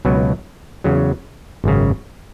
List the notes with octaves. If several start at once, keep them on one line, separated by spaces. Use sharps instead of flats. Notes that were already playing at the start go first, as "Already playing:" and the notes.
C#2 B2 F#3
E2 C#3 F#3
G#1 F#2 C#3